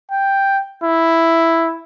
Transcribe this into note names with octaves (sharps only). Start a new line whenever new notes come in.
G5
E4